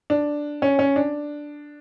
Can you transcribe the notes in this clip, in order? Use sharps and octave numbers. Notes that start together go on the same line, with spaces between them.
D4
C#4
C#4
D4